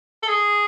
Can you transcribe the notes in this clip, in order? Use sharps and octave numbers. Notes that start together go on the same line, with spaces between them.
A4
G#4